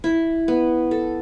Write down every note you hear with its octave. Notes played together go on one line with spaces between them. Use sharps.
E4
B3
A4